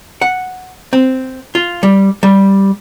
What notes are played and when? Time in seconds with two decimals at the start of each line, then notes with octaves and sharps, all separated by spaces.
0.22 F#5
0.93 C4
1.55 F4
1.83 G3
2.23 G3